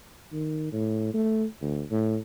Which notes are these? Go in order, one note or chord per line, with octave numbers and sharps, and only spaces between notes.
D#3
A2
A3
D2
A2